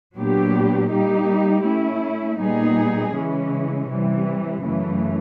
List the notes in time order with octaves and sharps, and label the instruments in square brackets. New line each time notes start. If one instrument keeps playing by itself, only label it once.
[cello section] A#2 F#3 B3 D4 G4
G3 A#3 D#4 G4
A3 C#4 E4
A#2 G3 B3 D#4 G#4
C#3 E3 G#3 C#4
C3 E3 G3
F#2 C#3 E3 A3